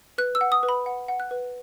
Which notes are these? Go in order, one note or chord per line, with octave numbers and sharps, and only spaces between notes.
B4 F#6
E6
F#5
D#6
B4
B5
F#5
F#5
F#6
B4